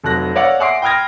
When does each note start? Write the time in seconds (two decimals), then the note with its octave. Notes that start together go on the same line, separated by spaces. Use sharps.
0.04 F1 F2 F#3 F#6 A#6
0.36 C#5 D5 F5 F#5 E6
0.60 E5 F#5 G#5 C6 D6 C7
0.82 G5 B5 D#6 F6 G#6 A#6